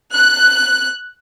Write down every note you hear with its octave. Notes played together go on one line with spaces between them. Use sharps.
F#6